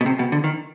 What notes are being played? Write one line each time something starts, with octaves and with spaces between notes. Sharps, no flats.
B2
C3
B2
D3
D#3